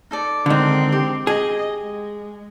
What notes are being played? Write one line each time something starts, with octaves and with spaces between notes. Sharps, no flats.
D#4 A4 D5
D3 D#3 G#3 C4
G4
G#4 D#5
G#3